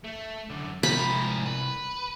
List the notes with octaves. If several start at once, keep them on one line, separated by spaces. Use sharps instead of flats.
A3
F#2 D3
C2 G#2 F3 B5
B4